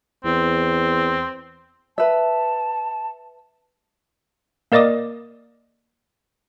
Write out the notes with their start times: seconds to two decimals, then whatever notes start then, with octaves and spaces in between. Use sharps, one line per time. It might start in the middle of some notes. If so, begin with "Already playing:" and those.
0.25 E2 C4
1.98 B4 E5 A5
4.72 A#3 A#4 D5 D#5 D6 D#6